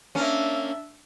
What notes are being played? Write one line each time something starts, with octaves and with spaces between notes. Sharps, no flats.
A#3 C#4 D4 E5